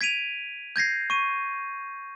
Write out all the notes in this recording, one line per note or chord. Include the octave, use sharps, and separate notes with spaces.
G#6 B6 D7 D#7 F7
G6 G#6 A#6 C7
C#6 D#7